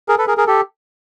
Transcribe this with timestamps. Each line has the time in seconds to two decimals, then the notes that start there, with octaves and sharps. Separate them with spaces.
0.08 G#4 A#4
0.18 A4 B4
0.27 G#4 A#4
0.37 G#4 A#4
0.47 G4 A4